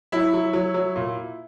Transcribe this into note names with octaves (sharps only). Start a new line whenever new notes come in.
F#3 E4
F#3
F#3
F#3
A#2